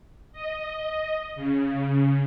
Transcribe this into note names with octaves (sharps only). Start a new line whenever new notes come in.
D#5
C#3